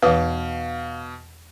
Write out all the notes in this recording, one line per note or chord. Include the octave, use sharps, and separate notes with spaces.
E2 B2 E3 B4 F5 D#6 E6